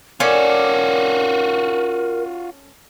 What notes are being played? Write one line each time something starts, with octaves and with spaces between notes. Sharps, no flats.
C#4 F4 F#4 A4 A#4 D5